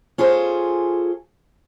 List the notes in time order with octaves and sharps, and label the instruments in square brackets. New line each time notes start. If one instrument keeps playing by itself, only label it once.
[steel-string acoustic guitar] C#4 F4 G#4 A4 C5